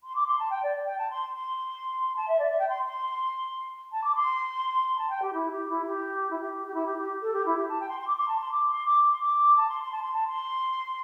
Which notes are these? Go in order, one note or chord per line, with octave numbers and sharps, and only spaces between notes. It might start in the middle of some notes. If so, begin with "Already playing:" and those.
C6
D6
C6
A5
G5
D5
G5
A5
C6
C6
A5
E5
D5
E5
G5
C6
C6
A5
D6
C6
A5
G5
G4
E4
G4
E4
G4
E4
G4
G4
E4
G4
G4
A4
G4
E4
G4
A5
G5
C6
C6
D6
C6
A5
C6
D6
C6
D6
C6
D6
A5
C6
C6
A5
C6
A5
C6